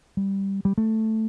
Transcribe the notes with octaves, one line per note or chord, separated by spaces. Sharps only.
G3
G3
A3